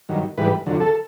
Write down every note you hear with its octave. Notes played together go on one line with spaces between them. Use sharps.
G2 D#3 F#3
G#2 E3 G3 B4
F2 D3 F#3
A4